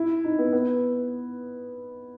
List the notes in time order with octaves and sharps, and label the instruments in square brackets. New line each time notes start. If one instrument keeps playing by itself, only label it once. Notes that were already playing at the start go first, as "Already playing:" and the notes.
Already playing: [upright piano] E4
D#4
B3
B3